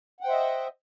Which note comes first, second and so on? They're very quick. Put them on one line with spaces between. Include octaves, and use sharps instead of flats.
F#5 G5 C5 E5 D#5